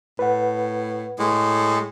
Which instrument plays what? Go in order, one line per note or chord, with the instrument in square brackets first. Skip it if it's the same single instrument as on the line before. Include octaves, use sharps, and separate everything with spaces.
[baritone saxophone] A2 [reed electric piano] B4 F#5
[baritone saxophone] A2 [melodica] G#3